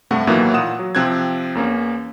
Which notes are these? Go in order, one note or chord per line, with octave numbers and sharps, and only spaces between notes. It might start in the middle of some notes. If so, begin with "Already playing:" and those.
G2 C3 A3 F#5
A2 D#3 E3 F#3 A#3 B3
A#2 F#5 D#6 E7
F#3
C3 F3 C4 F#6 G#6
E2 A#3 C#4